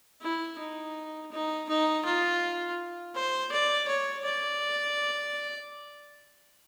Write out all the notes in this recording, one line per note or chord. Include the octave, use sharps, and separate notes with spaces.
E4
D#4
D#4
D#4
F4
C5
D5
C#5
D5